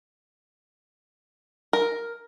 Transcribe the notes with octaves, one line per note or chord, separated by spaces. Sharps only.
A#4